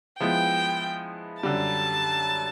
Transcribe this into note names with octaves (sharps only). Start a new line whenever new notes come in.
F3 G#3 B3 E4 G5
F#2 D3 G3 A5